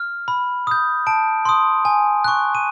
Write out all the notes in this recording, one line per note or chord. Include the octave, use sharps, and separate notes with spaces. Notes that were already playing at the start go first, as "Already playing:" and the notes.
Already playing: F6
B5
D#6 G6
A5 D7
C6 D#6
G#5
C#6 F#6
D#7